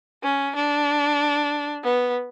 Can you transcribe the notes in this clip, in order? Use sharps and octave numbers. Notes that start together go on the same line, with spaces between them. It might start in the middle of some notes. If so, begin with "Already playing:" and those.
C#4
D4
B3